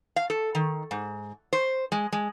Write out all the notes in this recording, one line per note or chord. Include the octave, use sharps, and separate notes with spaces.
F5
A4
D#3
G#2
C5
G#3
G#3